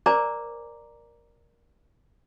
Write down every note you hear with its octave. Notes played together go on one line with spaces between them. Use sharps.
A#4 C5 D5 G#5 A#5 D6